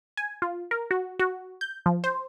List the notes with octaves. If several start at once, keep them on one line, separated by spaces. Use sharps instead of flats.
G#5
F4
A#4
F#4
F#4
G6
F3
C5